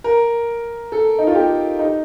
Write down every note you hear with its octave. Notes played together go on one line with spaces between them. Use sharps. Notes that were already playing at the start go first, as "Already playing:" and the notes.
A#4
A4
D#4
F4
G4
D#4